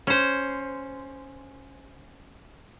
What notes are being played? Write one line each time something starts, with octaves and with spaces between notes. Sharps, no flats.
C#4 C5